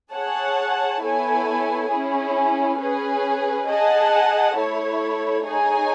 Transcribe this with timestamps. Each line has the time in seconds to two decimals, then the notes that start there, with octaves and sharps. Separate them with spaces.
0.13 G#4 C#5 F#5 A5
1.03 B3 E4 A4 C#5 G#5
1.91 C#4 E4 G#4
2.80 C#4 G#4 B4
3.68 G#4 D#5 F#5 A5
4.57 A3 E4 A4 C#5
5.46 D#4 G#4 C#5 G#5